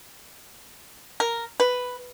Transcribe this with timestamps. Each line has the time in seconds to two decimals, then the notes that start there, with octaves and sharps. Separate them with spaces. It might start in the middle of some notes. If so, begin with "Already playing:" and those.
1.20 A#4
1.60 B4